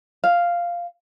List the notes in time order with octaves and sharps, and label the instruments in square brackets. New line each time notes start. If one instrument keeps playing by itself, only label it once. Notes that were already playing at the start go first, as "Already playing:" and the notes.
[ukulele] F5